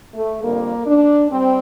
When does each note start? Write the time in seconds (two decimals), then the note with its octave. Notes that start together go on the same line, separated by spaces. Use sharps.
0.14 A3
0.43 F2 D3 G3 A#3
0.87 D4
1.30 G3 C4